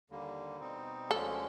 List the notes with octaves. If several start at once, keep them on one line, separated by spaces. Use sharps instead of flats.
D#2 D3 G3 A#3
B2 G3 C4 D#4
D2 D3 F3 G#3 C#4 A4